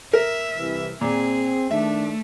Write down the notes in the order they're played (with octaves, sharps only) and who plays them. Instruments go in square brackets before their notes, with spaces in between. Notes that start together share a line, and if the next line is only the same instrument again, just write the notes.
[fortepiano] A#4 [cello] E5
[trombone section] C2 C3 E3
[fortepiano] A#2 [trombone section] C4 [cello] G#4
[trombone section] D#3 D4 [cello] A3 [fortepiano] E5